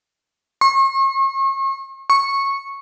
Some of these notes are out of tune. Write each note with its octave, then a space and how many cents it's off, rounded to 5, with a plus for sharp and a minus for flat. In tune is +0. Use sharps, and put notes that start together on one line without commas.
C#6 -45
C#6 -10